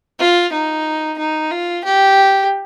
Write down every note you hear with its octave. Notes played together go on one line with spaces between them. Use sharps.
F4
D#4
D#4
F4
G4